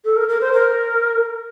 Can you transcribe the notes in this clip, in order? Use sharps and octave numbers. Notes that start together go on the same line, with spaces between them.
A4
A#4
A#4
C5
A#4